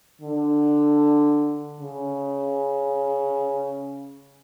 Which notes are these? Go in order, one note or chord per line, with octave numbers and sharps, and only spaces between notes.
D3
C#3